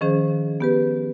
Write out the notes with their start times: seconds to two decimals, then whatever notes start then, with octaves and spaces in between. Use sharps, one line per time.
0.01 D#3 F3 C#4 G#4 C5
0.60 B3 G4 B4